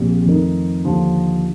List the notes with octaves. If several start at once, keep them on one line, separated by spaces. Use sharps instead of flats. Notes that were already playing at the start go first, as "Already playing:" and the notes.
Already playing: A#1 A#2 C4 G4
F2 D#3 A3 D#4 A#4
D#2 D3 F3